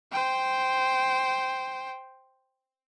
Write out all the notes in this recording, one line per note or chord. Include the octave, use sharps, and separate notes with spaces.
C5 G5